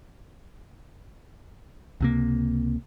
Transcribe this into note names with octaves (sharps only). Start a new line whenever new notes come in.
C#2 C3 A#3